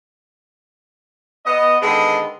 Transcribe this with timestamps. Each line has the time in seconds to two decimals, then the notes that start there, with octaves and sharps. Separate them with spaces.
1.46 B3 D#5
1.82 D3 D#3 G#3 B3